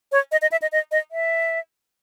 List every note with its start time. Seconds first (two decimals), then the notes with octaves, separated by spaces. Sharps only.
0.12 C#5
0.32 D#5
0.42 D#5
0.52 E5
0.62 D#5
0.72 D#5
0.91 D#5
1.11 E5